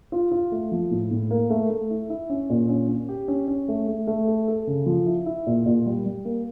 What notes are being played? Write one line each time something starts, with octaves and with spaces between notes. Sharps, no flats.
F4
F4
A3
F3
A2
A2
A#3
A3
A3
E4
E4
C#4
A#2
C#4
C#4
G4
C#4
C#4
A3
A3
A3
A4
A4
C#3
F3
E4
E4
A#2
A#2
G3
G3
A#3